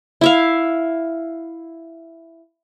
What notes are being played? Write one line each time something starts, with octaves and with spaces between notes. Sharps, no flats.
E4 E5 F5